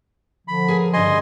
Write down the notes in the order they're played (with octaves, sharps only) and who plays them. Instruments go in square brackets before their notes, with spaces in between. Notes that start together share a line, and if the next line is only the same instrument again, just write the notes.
[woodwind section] D3 F3 [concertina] B5
[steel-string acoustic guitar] G#4 A#4 G#5
[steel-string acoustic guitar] G2 C#3 G3 [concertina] D#5 G#5 C6